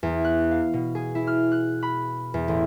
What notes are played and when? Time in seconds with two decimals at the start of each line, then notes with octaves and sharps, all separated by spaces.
0.03 E2
0.24 F#6
0.51 F5
0.74 B2
0.95 G#4
1.15 E4
1.27 F6
1.52 F#6
1.83 B5
2.34 E2
2.48 A1